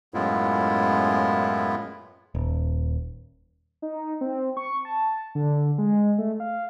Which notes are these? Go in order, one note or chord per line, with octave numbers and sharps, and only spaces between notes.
F#2 A2 G#3 B3 E4 F4
D#1
D#4
C4
C#6
A5
D3
G#3
A3
F5